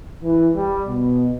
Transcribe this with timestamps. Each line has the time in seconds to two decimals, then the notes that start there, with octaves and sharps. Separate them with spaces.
0.22 E3
0.54 G3
0.87 B2